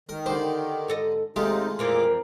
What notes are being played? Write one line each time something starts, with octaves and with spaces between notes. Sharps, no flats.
D#3 A#4
D3 G4 C5
G#2 A4 D#5
D#2 C3 G#3 A3 D#4 F4 G4
F2 A#2 E3 F3 A#4 D6